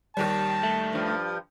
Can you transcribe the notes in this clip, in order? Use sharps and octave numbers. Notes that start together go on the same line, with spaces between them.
D#2 D#3 G3 A5
A3
G2 F3